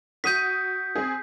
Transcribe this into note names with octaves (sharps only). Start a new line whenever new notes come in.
F#4 D#6 G6 B6 D#7
C4 G#4